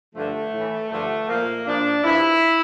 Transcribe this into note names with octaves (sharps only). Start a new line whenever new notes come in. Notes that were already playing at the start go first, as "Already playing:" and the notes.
G2 D3 F3 A3
A2 E3
G2 D3 F3 A3
A#2 F3 A#3
A#2 F3 D4
G2 F3 E4